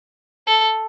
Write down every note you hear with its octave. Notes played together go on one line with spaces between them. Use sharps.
A4